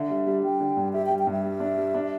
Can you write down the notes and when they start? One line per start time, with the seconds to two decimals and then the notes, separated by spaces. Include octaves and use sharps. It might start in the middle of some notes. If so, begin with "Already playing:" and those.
Already playing: D3 E5
0.10 G3
0.27 G3
0.43 G3 G5
0.60 D3
0.77 G2
0.93 G4 E5
1.06 G5
1.10 G3
1.19 G5
1.27 G2 E5
1.44 G3
1.60 D4
1.77 G3
1.94 D4